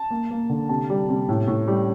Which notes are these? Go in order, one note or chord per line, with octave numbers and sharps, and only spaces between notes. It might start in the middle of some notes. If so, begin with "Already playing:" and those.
Already playing: A5
A#3
A#3
D3
C3 A5
G3
C3
A2
A2
G3